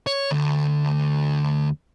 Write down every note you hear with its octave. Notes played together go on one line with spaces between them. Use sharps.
C#5
D2